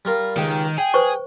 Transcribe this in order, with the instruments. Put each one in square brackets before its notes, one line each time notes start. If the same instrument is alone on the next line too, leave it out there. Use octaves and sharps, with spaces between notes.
[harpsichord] G3 F4 A#4
[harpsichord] C#2 G4 [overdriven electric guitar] D#3
[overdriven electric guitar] G#4 [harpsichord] G5
[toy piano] B4 C5 C#6